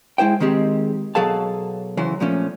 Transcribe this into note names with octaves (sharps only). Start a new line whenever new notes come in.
G#3 E4 C5 G5
D#3 G#3 C4 G4 G#4
B2 F#3 G#4 A4 F5 A5
C#3 E3 F#3 C5
A#2 F3 A3 C#4